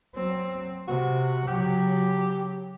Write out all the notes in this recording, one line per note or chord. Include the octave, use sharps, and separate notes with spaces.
F#3 C4
C3 F#4
C#3 F#3 G4